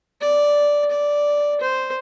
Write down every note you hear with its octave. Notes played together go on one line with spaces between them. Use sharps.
D5
D5
C5